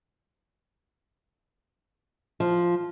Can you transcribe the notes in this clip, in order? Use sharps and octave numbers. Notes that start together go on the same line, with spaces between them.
F3